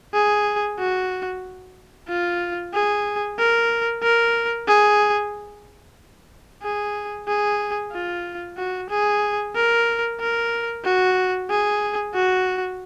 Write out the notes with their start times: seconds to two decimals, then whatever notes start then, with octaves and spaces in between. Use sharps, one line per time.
0.14 G#4
0.79 F#4
2.08 F4
2.73 G#4
3.38 A#4
4.02 A#4
4.68 G#4
6.63 G#4
7.27 G#4
7.92 F4
8.57 F#4
8.90 G#4
9.55 A#4
10.20 A#4
10.85 F#4
11.50 G#4
12.15 F#4